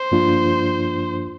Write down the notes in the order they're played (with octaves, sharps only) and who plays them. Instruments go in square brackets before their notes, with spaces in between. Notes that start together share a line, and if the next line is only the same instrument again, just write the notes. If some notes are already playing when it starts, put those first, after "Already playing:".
Already playing: [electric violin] C5
[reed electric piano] G2 F3 A#3 D4 F4